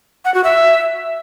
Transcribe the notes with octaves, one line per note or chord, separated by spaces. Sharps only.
F#5
F#4
E5